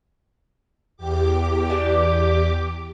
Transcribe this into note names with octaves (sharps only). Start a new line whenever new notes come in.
E2 G4 D6
D4 G#4 D5